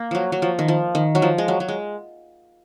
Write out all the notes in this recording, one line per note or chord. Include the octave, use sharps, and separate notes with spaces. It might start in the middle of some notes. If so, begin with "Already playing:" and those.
Already playing: A#3
F3 F#3
F#3
F3
D#3
F3
D#3
F#3
F3
G#3
F#3
F#3
G#3